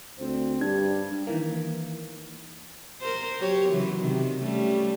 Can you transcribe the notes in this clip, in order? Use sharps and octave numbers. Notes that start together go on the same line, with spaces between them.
D2 C4
G2 G3 D4 G#6
D#3 E3 A#3
A#4 C5
F#3 G4 C#5
C#3 E3 F#3
C3 D#3
G3 A3 C#4